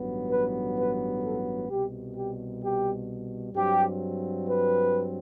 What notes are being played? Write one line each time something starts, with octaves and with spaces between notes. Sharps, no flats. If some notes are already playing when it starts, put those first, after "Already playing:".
Already playing: A1 G2 F#3 B3
B4
B4
A4
C2 B2 G3 G4
G4
G4
G2 F#3 C4 G4
B4